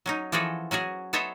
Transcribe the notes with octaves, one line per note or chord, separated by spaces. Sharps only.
F#3 C#4 D#4
E3 F3 F#4 G#4 A4
F#3 C#4 F#4 G#4
B3 A4 C5 C#5 D#5 E5